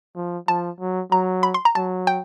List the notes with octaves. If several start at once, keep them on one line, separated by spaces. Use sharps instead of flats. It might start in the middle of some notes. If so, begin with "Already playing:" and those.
F3
F3 A5
F#3
F#3 A#5
B5
C6
A#5
F#3 A5
G5